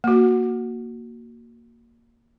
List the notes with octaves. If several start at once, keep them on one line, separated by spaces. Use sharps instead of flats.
A#3 F#4